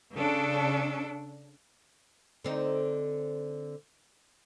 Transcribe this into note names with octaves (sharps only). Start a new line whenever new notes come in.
C#3 D4 A4
D3 C4 D#4